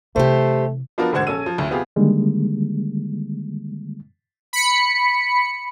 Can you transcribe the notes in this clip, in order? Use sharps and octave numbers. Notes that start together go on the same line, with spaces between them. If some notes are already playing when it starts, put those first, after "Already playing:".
C3 E3 A3 G4 C5
F3 B3 D4 F4 F#4 A#4
E1 G#2 D3 C5 F#5 G#6
A#1 C#4 A4 E6 D#7
F3
F#1 D2
C3 B3 F4 G4 G#4
D3 D#3 G3 G#3 A#3
B5 C#7